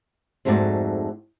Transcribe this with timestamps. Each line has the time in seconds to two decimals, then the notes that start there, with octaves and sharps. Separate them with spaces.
0.45 F2 G#2 A3 D#4 F#4 D5